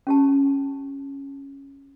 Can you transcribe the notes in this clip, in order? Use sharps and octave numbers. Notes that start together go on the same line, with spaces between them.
C#4 G4 A5